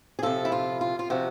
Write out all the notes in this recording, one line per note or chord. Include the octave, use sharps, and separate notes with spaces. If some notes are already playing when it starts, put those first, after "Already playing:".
G#4
C3 F3 A4
E4
F4
F4
F4
C3 F3 F#4